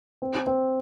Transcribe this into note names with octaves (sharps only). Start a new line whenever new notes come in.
C4
C4